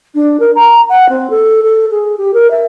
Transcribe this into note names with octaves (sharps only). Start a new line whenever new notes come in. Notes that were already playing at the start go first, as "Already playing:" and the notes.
D4
A#4
A#5
F#5
C4
A4
A4
G#4
G4
A#4
E5